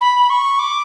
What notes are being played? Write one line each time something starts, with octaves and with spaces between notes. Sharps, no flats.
B5
C#6
D6